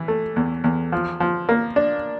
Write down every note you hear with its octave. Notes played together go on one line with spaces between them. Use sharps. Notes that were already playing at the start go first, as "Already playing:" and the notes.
Already playing: E3
A3
E2
E2
F3
F3
A#3
D4